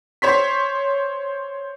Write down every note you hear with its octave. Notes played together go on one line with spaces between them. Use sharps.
C5 C#5 C6 B6